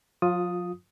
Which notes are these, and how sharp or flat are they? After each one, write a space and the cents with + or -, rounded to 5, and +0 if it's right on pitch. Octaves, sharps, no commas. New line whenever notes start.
F3 +45 F4 +15 D#6 +0